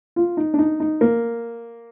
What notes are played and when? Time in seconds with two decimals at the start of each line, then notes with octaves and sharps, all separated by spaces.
0.16 F4
0.37 D#4
0.54 D4
0.59 D#4
0.80 D#4
1.01 A#3